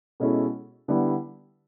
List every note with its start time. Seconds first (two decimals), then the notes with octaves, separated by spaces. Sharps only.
0.20 B2 G#3 C#4 E4 A4
0.88 D3 G3 B3 E4